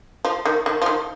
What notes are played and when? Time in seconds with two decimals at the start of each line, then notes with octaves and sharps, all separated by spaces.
0.25 F3
0.45 D#3
0.66 D#3
0.82 F3
0.86 D#3